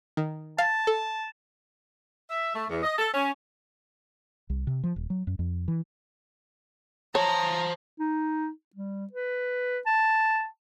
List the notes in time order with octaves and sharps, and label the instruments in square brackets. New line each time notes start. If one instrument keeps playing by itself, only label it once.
[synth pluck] D#3
[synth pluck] F5 [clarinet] A5
[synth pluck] A4
[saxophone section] E5
A3
E2
D#5
A4
C#4
[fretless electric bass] C2
C3
F3
D#1
F#3
F#2
F2
E3
[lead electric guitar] C5 A5 [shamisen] C#5 [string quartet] A#5
[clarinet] D#4
G3
B4
A5